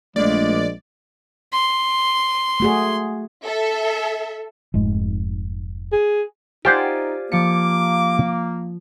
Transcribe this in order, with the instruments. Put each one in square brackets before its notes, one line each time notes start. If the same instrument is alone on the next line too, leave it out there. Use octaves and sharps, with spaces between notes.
[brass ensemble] A#1 [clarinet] G#3 [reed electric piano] A3 [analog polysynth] D5
[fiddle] C6
[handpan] A3 F#4 G#4
[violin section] A4 E5
[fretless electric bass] F1 G#2 G#3
[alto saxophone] G#4
[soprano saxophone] D#4 [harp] F4 D5 G#5 [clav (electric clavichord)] G4 C5 F#5
[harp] F3 C#7 [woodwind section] A#3 [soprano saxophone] D6